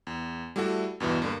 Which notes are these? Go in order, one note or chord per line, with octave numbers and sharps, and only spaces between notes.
E2
G3 A3 E4 F#4 A4
E2 G2 B2 E3
G2 D3 A#3